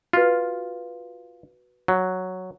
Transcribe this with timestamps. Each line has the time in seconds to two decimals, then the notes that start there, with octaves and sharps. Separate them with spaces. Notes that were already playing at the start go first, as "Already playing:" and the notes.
0.13 F4 F#4 B4
1.88 F#3